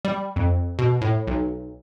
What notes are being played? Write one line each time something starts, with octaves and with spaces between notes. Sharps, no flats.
G3
F2
B2
A2
B1